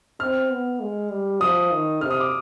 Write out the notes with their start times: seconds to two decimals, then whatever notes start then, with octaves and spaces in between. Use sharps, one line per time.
0.20 C4 F6
0.51 B3
0.80 G#3
1.10 G3
1.41 F3 D#6
1.71 D#3
2.01 C3 F6
2.11 D#6
2.20 D6